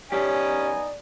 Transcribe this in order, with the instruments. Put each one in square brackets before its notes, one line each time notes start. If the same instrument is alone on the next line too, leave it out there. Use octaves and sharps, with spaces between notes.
[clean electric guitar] F#2 G4 [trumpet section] B3 D#4 G#5 [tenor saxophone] C#4 [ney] D5